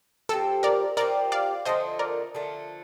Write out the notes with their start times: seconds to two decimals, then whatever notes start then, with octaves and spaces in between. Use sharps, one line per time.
0.29 F3 C4 G4 A4
0.63 A#4 D5
0.97 F3 C4 G4 A#4 D5
1.32 D5 F5
1.65 D3 F3 A3 C5 D#5
1.99 A#4 D5
2.34 D3 F3 A3